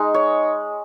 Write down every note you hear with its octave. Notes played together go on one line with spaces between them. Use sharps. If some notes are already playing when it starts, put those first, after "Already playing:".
Already playing: G#3 D#4
C#5